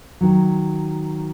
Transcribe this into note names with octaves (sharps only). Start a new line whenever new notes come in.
D#3 F#3